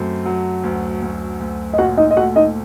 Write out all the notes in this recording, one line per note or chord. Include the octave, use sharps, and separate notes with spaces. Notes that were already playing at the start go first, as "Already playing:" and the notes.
Already playing: F#2 A3 C4
F#3
D2
D2
D2
D#5
A#2 F#4 F#5
D#4 D#5
D#5
A3 F#4 F#5
D#4 D#5